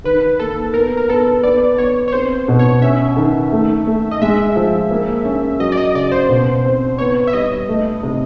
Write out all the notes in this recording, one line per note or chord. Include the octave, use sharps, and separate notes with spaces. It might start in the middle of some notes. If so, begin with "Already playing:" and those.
D#3 B4
A#3 A4
B3 A#4
A#4
B3 A4
B3 D5
B3 C#5
C#5
C4 C5
B2
C#5
C#4 E5
D#3
A3
A3
D#5
G#3 E5
F3
A#3
C#4
F#3 D#5
D5
D#5
C#3 D5
C5
B2
C4
B3 C#5
E5
G3 D#5
A3
C3